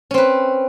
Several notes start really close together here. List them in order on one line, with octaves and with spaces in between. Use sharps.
C#4 C4 B4